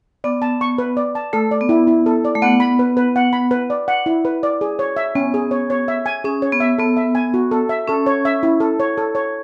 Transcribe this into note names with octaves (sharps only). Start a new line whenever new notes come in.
B3 D5
A5
C#6
B4
D5
A5
A3 A4
D5
B3
E4
E4
A4
D5
A3
B3 F#5
B5
B4
B4
F#5
B5
B4
D5
F#5
E4
B4
D5
G#4
C#5
E5
B3 C#4
G#4
C#5
C#5
E5
G#5
C#4 G#4
C#5
B3
E5
B3 A4
E5
G#5
F#4
A4
E5
C#4 A4
C#5
E5
E4
A4
C#5
A4
C#5